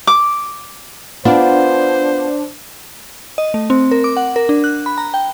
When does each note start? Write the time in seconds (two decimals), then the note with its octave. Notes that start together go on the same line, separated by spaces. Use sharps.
0.07 D6
1.25 B3 D4 F4 C5
3.38 D#5
3.54 A3
3.70 C4
3.91 A#4
4.04 D6
4.17 F#5
4.36 A#4
4.49 D4
4.64 F#6
4.86 B5
4.98 A#5
5.14 G5